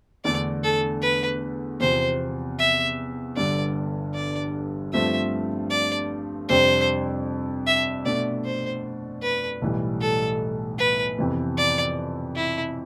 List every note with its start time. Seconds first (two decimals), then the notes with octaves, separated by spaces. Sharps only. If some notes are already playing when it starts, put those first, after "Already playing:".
0.25 E2 D3 A3 D4 D5
0.64 A4
1.02 B4
1.80 E2 C3 F3 C5
2.59 E5
3.37 G1 G2 D3 D5
4.14 D5
4.93 G2 F3 A3 C4 G4 E5
5.70 D5
6.49 F2 C3 G3 D4 C5
7.67 E5
8.05 B2 A3 D4 D5
8.45 C5
9.22 B4
9.62 B1 A2 E3 G3
10.01 A4
10.78 B4
11.17 F2 C3 E3 B3
11.57 D5
12.36 E4